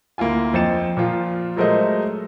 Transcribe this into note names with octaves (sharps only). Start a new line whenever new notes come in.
D2 A#3 E4 F4 G#5
F2 C5 D#5 A6 C#7 E7
A#2 F3 F4
F#3 G#3 A3 A#4 C5 D#5